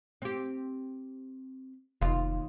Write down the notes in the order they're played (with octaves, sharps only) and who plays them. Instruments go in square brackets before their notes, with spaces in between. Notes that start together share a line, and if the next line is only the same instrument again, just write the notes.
[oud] C4 G4
[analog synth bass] F1 [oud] D#2 F4